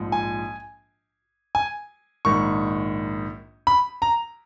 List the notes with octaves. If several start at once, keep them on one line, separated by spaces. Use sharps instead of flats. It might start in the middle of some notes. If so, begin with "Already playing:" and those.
Already playing: A#1 G#2 F3
G#5
G#5
A#1 G#2 D#3 C#6
B5
A#5